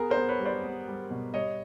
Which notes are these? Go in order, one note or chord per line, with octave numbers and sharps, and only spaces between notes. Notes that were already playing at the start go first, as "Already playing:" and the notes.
Already playing: B3 G#4 A#4
A#4 C5
B3
B4 C#5
G3
C5 D5
B3
G3
B2
G3 C#5 D#5